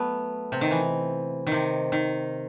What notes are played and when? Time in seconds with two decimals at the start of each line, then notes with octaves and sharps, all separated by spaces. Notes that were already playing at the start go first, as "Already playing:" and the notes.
Already playing: F#3 A3 B3
0.52 C3
0.61 D#3
0.71 E3
1.47 D#3
1.52 C3
1.92 D#3